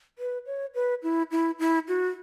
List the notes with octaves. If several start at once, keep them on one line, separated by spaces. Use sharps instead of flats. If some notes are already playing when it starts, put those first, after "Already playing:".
B4
C#5
B4
E4
E4
E4
F#4